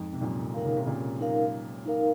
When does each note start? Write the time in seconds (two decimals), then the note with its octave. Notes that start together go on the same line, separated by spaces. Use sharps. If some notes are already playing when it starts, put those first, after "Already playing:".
Already playing: F2 G#2
0.13 C3
0.21 F#2 A#2
0.54 D#3 D#4 A#4 F5
0.65 C#3
0.76 C3
0.86 A#2 C#3
1.20 D#4 A#4 F5
1.86 D#4 A#4 F5